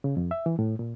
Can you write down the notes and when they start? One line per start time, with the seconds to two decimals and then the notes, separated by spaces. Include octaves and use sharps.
0.04 C#3
0.17 F2
0.31 E5
0.46 E3
0.59 A2
0.79 A#2